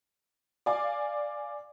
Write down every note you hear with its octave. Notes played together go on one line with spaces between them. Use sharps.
D5 F5 G#5 D6